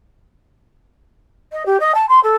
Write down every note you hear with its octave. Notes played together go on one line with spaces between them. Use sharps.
D#5
G4
D#5
A5
C6
A4